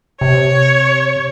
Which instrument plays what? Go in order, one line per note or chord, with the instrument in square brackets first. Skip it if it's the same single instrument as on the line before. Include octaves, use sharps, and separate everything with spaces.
[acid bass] C3 [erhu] C#5